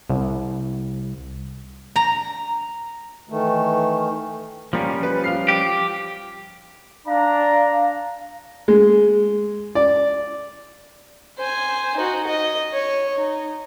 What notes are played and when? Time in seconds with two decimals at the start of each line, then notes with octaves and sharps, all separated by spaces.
0.10 C2
1.96 A#5
3.29 D#3 E3 A3
4.73 F3 G3 A#3 C#4
5.03 B4
5.24 F4 F6 C7
5.48 G4
7.07 D4 F5 A#5
8.68 G#3
9.75 D5
11.38 C5 G#5
11.97 D#4 F#4
12.27 D#5
12.73 C#5
13.17 D#4